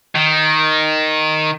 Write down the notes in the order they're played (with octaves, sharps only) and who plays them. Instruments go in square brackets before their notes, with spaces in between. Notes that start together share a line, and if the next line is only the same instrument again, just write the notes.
[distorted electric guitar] D#3